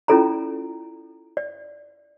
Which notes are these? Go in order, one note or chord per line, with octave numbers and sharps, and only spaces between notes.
C#4 E4 F4 A4 D5 A#5
D5